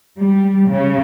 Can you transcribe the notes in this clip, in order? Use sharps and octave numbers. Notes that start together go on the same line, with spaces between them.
G3
C#3